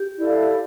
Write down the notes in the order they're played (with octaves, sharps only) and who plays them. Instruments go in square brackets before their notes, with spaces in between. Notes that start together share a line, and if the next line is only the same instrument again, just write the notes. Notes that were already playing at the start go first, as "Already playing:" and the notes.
Already playing: [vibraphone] G4
[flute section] E4 A4 D5 F5